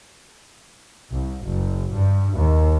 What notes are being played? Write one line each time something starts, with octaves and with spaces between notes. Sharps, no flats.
C2
F#1
G2
D#2